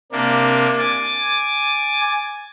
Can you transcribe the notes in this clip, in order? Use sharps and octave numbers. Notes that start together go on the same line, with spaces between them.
C3 A#3 D4
G#5 D6 A6